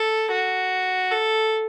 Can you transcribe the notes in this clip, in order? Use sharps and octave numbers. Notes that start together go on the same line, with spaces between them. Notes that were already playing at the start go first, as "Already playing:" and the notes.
Already playing: A4
F#4
A4